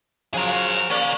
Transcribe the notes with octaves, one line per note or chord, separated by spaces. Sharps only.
C#3 F3 F#3 G#4 A#4
A#3 G#4 C#5 D5